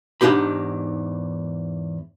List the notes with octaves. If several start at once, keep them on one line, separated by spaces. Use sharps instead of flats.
E2 G#2 D4 D#4 G4 B5